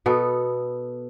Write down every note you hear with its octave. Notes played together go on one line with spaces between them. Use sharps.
B2 B3 A4